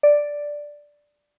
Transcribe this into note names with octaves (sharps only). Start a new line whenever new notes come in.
D5